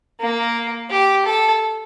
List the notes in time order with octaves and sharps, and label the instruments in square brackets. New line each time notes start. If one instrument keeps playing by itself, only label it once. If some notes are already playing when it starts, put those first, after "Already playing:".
[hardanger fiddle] A#3
G4
A4